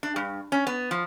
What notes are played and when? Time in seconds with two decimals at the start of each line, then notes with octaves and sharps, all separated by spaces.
0.03 D4
0.16 G2
0.52 C#4
0.67 B3
0.91 F3